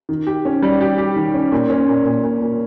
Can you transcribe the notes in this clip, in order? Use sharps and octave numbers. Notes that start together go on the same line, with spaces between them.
D#3
G4
C#4
G3
G4
G4
D#3
C#4
A#2
C#4
A#2
A#2
A#2
A#2